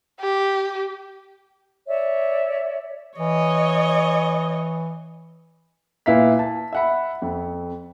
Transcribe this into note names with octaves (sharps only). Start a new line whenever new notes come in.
G4
C#5 D5 E5
E3 C#5 D#5
A#2 E4 B4 F5 B6
A5
E5 F#5 B5
F2